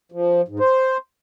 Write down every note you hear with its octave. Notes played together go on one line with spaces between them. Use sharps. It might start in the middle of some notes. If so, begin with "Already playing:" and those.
F3
G#2
C5